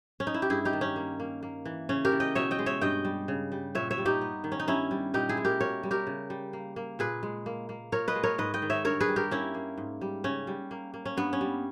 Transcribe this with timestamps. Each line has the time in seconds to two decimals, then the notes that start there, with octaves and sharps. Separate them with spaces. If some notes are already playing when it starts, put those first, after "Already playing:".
0.20 C#4
0.27 D#4
0.34 E4
0.42 G4
0.50 G2 E4 G#4
0.65 D#4 G4
0.73 D#3
0.81 C#4
0.96 A#3
1.20 A#3
1.43 A#3
1.65 E3
1.89 C#3 C#4
2.05 G4 A#4
2.12 E3
2.20 D#5 G5
2.35 B2 C#5 E5
2.51 D#5 G5
2.59 G#3
2.66 C#5 E5
2.81 G2 D#5 G5
3.05 G3
3.28 C#3
3.52 G3
3.75 A#2 C#5 E5
3.91 C#5 E5
3.98 G3
4.05 D#4 G4
4.21 B3
4.44 D#3
4.52 C#4
4.60 D#4
4.67 G2 C#4 E4
4.91 G3
5.14 A#2 D#4 G4
5.29 E4 G#4
5.37 G#3
5.45 G4 A#4
5.60 B2 A#4 C#5
5.83 G3
5.91 G4 A#4
6.07 C#3
6.30 G3
6.53 A#3
6.76 A#3
6.99 A#2 G#4 B4
7.23 G#3
7.46 A#3
7.69 A#3
7.92 A#2 A#4 C#5
8.08 B4 D#5
8.15 G#3
8.23 A#4 C#5
8.38 G#2 B4 D#5
8.54 D#5 G5
8.62 D#3
8.70 C#5 E5
8.85 G2 A#4 C#5
9.00 G#4 B4
9.08 G3
9.16 G4 A#4
9.31 A#3 C#4 E4
9.54 A#3
9.78 G#2
10.01 G3
10.24 C#3 C#4
10.47 G3
10.71 A#3
10.94 A#3
11.05 C#4
11.17 G2 B3
11.33 C#4
11.41 G3